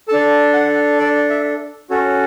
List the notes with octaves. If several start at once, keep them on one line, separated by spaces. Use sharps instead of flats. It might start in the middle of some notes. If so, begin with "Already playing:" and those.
D4 A4 A5
F#5
D5
E5
C#4 F#4 A4 C#5